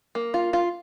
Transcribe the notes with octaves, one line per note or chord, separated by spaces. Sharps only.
A#3
F4
F4